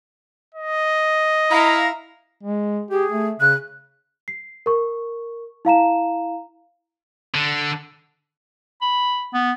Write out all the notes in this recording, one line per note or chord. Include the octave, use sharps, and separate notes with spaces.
D#5
E4 F5 A#5
G#3
G4 G#4
A3
C#3 F#6
C7
A#4 C#6
E4 F5 A#5 E7
D3
B5
B3